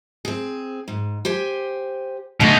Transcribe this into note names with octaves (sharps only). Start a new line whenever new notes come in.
C4 G#4
G#2
G4 C5 G#5
B2 D3 A3 D4 D#4